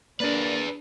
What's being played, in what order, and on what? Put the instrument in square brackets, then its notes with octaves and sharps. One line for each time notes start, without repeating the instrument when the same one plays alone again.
[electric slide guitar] A#3 A#4 [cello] D4 [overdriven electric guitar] G#4 B4 [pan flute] D5